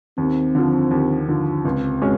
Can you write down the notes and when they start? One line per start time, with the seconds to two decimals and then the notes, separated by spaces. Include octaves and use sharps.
0.18 D#2 C4
0.55 D3 F3
0.91 D#2
1.28 D3 F3
1.64 C#2 C4
2.01 B2 G#3 C#4